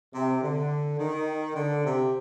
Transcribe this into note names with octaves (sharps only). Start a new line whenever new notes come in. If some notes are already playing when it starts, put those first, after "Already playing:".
C3
D3
D#3
D3
C3